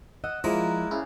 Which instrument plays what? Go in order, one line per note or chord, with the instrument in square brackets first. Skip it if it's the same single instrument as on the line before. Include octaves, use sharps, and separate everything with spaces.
[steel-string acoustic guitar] D#5 [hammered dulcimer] F#5 [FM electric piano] E6
[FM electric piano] F3 [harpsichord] G#3 [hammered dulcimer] A#3 D5 A#5 [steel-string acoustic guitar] E4
[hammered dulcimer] C#3 G#4 [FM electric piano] E4